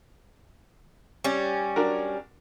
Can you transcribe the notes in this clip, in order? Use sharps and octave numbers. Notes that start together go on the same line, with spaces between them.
G3 C#4
D4 F#4 A#4